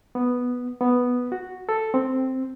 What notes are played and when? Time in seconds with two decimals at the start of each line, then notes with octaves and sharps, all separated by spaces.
0.15 B3
0.81 B3
1.32 F#4
1.69 A4
1.94 C4